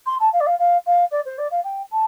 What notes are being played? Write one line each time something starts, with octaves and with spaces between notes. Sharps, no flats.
C6
A5
F5
D5
F5
F5
F5
D5
C5
D5
F5
G5
A5